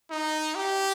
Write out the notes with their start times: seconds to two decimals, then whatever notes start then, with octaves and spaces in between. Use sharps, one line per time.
0.10 D#4
0.55 G4